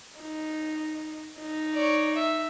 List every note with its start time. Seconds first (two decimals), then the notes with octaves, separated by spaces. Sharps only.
0.20 D#4
1.41 D#4
1.74 C#5 D5
2.16 E5